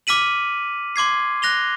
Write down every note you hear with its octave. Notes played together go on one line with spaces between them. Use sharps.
D6 F6 B6 D#7 F#7
C6 D6 G#6 C7
F#6 A#6 F7 G7